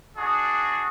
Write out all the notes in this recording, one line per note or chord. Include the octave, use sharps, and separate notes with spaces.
D4 F#4 G#4